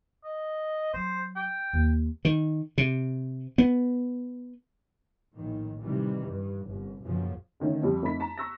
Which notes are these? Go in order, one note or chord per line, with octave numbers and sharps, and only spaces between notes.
D#5
F#3 C5
G5
D#2
D#3
C3
B3
A#1 A2 D#3
C3 D#3 E3 G3
G2
G1 C2
B1 F#2 A#2 C#3 F3
D3 D#3 A3 C#4
F2 F3 G3
F2 A3 D#4 B5 B6
A5 A#5
C#6 E6 F#6 A#6